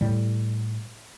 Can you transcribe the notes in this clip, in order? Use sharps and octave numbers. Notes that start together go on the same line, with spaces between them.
A2 G3